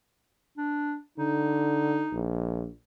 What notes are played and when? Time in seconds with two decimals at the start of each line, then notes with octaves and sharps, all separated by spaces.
0.57 D4
1.18 D3 D#4
2.12 A#1